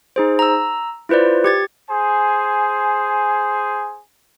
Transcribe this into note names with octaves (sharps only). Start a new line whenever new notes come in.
D#4 G#4 C5
A#5 E6
E4 F4 B4 C5 D5
G4 G#6 A6
G#4 C5 G#5